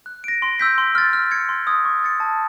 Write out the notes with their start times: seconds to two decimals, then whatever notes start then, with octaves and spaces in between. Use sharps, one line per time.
0.06 F#6
0.24 A#6 D7
0.42 C6
0.60 E6 G6 B6
0.78 C6
0.95 F6 A6
1.13 F6
1.31 G#6 C#7
1.49 C6
1.67 D#6 G#6
1.85 C#6
2.03 F6 A6 C#7
2.20 A5